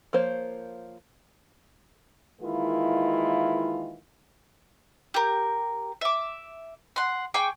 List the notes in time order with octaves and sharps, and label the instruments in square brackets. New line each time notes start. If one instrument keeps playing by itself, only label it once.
[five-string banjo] F3 A#3 C5 C#5
[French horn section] D#3 E3 G#3 A#3 E4 F4
[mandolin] G4 A#4
E5 D6
F#5 C6
G#4 G5 C#6 D6